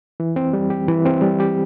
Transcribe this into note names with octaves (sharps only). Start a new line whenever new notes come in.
E3
C4
G3
G4
E3
C4
G3
G4